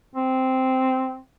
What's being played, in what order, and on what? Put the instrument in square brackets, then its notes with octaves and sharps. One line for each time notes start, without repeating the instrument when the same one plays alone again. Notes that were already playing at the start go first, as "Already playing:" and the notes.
[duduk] C4